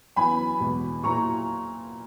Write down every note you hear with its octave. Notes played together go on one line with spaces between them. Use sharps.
F#2 E3 B3 G#5 B5
E2 B2 G#3
A#2 F#3 A#3 E4 A#5 C#6